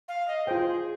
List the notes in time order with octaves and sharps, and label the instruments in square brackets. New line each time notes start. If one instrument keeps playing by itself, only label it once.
[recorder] F5
D#5
[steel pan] F4 C5 G5 [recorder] G#4